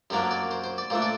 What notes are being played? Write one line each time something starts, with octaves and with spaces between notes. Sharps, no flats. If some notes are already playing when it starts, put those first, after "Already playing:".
F#2 F#3 A#3 D4 C5
D5
C5
C5
D5
A#2 A3 D4 C5
D5